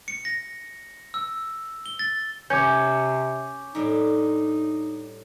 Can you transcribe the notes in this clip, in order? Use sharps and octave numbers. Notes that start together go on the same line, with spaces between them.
C#7
A#6
E6
G7
A6
C3 C#4 D6 G6
A2 G3 D4 D#4